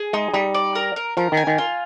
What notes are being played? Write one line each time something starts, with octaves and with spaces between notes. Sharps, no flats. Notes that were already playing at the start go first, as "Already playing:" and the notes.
Already playing: G#4
G#3 D#4
G3 D#4
D5
A#4
A#4
F3 A#4
D#3
G#5
D#3
F4